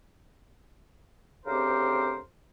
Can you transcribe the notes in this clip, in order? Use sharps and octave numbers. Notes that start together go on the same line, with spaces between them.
D2 C#3 C4 G4 A#4 C5